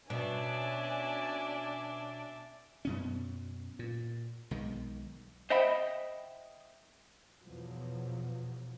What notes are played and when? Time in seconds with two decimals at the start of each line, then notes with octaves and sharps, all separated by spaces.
0.10 B2 C#4 D4 D5 E5 G#5
2.85 F#2 B2 C#4
3.79 A#2
4.51 B1 D#3 G#3
5.50 C5 D#5 E5 F#5 G5 B5
7.41 E2 B2 F3 F#3